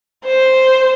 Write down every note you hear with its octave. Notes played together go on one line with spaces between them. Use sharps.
C5